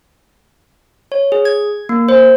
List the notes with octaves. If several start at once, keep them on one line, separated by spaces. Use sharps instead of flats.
C#5
G#4
G#6
A#3
C5